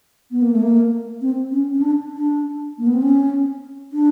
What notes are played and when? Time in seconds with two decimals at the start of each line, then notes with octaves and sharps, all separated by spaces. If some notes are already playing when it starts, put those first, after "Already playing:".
0.31 B3
0.42 A#3
0.53 A3
0.62 A#3
1.22 C4
1.52 C#4
1.74 C#4
1.82 D4
2.12 D4
2.78 A#3
2.87 B3
2.94 C4
3.02 C#4
3.92 D4